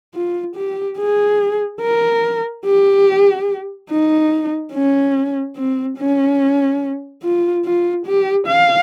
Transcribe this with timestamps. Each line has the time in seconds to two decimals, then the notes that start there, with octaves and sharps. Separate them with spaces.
0.15 F4
0.56 G4
0.98 G#4
1.81 A#4
2.66 G4
3.90 D#4
4.73 C#4
5.57 C4
5.98 C#4
7.23 F4
7.65 F4
8.06 G4
8.47 F5